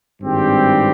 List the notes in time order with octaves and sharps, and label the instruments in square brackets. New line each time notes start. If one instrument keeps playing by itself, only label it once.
[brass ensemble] G#1 G2 G3 C4 G4